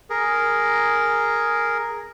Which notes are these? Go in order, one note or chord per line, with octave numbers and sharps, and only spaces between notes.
G#4 A#4